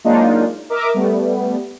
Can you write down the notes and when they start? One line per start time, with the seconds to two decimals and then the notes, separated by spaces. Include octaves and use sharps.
0.04 F#3 G#3 A#3 D4 D#4 F4
0.70 A#4 D#5 E5 D6
0.94 G3 A3 B3